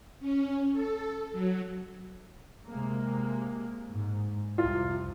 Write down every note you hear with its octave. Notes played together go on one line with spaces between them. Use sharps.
C#4
A4
F#3
C3 G#3 A#3
G#2
C2 F2 C3 F4